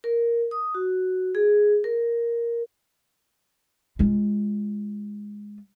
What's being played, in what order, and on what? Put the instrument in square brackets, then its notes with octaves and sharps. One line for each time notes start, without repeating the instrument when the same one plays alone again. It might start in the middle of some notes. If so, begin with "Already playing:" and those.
[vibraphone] A#4
D#6
F#4
G#4
A#4
[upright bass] G#3 F4